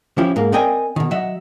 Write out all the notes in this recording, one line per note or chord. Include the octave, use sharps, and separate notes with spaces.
F3 C#4 E4 G4
G#2 A#3
C4 A#4 D5 D#5 G5 G#5
B2 D#3
F#3 D#5 E5 F#5